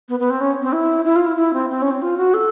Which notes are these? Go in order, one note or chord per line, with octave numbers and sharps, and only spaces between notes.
B3
B3
C4
C#4
C4
E4
E4
F4
E4
E4
C4
C4
C#4
C4
F4
F#4
A4